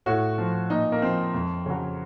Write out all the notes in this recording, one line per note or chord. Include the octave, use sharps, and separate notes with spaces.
A2 F#4
F3
A#2 D#4
A#3
F3 C4
F2
C#3 F#3